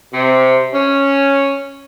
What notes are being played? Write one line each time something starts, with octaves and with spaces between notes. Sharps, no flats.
C3
C#4